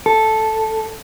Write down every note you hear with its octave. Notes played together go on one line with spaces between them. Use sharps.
A4